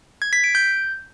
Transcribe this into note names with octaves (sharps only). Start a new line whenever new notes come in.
G#6
B6
D7
G6